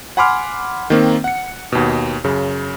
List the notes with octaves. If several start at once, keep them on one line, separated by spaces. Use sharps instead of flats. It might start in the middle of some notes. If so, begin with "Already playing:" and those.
F#5 G#5 B5 C6 D6 F6
D#3 A#3 C4
F#5 C#7
D#2 B2
F#2 C#3